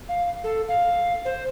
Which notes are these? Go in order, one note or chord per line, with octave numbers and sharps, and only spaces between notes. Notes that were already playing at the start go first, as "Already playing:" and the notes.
F5
A4
F5
C5